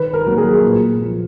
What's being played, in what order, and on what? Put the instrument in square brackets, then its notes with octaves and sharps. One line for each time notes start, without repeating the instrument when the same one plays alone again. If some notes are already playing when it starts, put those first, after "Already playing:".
Already playing: [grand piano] D#3 B4
A#4
F#3 A#3
G#4
A#2
F3 A#3